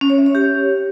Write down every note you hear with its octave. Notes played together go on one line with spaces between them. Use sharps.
C#4
C#5
E5
C#5
G4